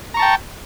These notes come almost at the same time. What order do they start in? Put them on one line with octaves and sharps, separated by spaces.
A#5 C#6 A5 G5